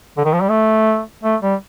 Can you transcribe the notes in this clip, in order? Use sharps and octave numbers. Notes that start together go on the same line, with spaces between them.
D3
D#3
F3
G3
A3
A3
G3